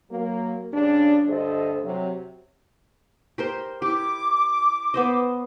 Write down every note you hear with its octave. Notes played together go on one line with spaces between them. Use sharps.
F#3 A#3
G2 C#3 D4
D2 G2 A4 C5 D#5
C3 F#3
G4 A#4 C5
E4 G4 D6
B3 C5 D#5